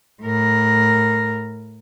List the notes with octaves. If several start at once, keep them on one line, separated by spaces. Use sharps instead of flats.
A2 A#4